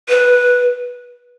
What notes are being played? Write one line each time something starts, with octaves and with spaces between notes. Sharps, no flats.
B4